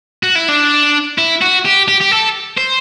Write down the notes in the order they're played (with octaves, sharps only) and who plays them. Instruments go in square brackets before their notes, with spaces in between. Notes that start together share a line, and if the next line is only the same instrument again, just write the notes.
[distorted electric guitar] F#4
E4
D4
E4
F#4
G4
G4
G4
A4
C5